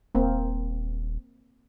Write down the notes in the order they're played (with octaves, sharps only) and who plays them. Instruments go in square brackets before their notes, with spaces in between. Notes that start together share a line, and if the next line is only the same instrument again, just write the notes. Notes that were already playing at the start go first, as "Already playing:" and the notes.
[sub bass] D#1 [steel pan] A#3 C4